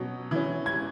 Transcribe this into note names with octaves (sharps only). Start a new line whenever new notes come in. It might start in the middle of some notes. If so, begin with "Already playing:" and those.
Already playing: B2 F#3 C#4
E3 C#4
G#6